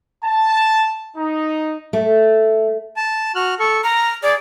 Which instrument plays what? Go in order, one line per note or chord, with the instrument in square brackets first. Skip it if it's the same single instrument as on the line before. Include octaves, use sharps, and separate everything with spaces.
[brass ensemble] A5
D#4
[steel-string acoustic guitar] A3
[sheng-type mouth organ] A5
F#4 F6 F#6
A4 C#6
[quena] A#5 [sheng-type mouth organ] F6
[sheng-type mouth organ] G#4 [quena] D5